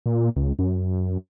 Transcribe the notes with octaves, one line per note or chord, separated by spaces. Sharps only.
A#2
C#2
F#2